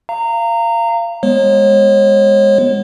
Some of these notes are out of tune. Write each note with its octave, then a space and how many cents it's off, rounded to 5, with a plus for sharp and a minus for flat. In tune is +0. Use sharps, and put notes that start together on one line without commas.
F5 -25 A#5 -20
G#3 -15 B3 +0 C#5 -35